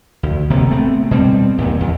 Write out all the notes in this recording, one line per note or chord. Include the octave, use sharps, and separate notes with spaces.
D2
E1 C3 D#3 A#3
A3 B3 C4
B2 G3 G#3 C4
D#2 A#2 D#3
D#2